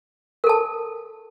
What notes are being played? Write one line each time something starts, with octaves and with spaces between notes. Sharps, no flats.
A4 A#4 A5